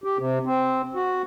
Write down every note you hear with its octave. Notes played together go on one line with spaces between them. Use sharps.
G4
C3
C4
F#4